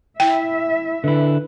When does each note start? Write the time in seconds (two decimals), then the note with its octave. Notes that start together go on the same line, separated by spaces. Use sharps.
0.20 E4 E5 G5
1.04 D3 E4 B4